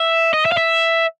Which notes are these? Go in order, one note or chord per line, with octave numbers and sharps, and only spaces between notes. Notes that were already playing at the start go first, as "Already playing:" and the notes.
Already playing: E5
D#5
E5
F5
E5